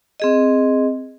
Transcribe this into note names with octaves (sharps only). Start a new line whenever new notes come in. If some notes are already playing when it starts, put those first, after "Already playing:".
C4 G#4 D#5